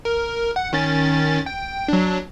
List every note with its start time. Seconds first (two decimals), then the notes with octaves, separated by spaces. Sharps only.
0.05 A#4
0.56 F#5
0.73 D#3 C#4 A6
1.46 G5
1.88 F#3 D4